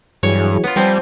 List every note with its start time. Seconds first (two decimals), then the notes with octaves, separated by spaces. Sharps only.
0.23 G2 E3 F#3 G#4 C#5
0.64 B3 F4
0.76 F3 G3 C4 G#5